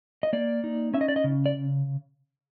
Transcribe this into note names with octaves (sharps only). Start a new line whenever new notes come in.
D#5
A#3 D5
D#4
C#4 E5
D#5
D5
D#5
C#3
D5